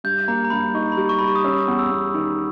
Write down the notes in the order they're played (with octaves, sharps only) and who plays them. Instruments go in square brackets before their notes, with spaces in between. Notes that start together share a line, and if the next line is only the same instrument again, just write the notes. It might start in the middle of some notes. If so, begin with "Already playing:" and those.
[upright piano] G2 [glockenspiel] G6
[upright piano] A#3 [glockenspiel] A#5
[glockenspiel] A#5
[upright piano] G2 [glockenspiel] B5
[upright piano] D#4 [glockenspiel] C#6
[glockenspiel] A#5
B5
[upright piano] G3
[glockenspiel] C#6
[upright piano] G3 [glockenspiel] B5
[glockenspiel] C#6
D#6
[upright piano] C#4 [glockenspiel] E6
[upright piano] E2
[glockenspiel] E6
[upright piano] E2
D#3